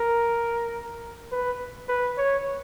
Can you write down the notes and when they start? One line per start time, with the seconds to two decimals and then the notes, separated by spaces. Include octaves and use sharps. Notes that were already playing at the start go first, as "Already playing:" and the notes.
Already playing: A#4
1.32 B4
1.88 B4
2.18 C#5